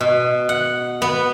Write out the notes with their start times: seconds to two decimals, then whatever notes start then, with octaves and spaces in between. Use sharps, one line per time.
0.01 B2
0.49 F#5
1.02 B3